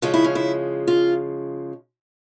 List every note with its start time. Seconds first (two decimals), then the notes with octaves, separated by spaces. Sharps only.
0.02 C#3 F3 G#3 F4
0.14 E4
0.24 C#4
0.35 E4
0.87 F4